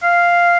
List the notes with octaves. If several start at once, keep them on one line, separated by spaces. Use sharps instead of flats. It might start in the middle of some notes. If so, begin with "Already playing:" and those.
F5